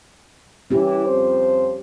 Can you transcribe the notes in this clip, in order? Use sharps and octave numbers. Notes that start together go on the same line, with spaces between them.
E3 C#4 G4
F2 C5